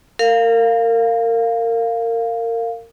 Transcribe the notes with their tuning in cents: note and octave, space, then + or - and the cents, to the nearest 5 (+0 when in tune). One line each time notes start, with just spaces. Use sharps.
A#4 -30 F5 +0